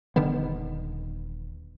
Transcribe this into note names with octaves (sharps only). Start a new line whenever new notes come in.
D#1 D3 D#3 B3